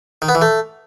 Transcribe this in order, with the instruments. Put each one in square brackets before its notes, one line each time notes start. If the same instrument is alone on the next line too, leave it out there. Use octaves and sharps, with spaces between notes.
[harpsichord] D#3
B3
E3
A3